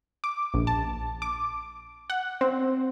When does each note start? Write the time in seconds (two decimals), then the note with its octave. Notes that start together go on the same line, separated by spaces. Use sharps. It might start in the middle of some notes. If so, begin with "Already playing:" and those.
0.24 D6
0.54 A#1
0.67 A5
1.22 D6
2.10 F#5
2.41 C4